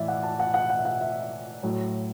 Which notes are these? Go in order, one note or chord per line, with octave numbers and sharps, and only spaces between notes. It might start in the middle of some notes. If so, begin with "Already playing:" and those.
Already playing: A2 E3 D5 E5
F#5
A5
F#5
F#5
F#5
E5
F#5
E5
A2 F#3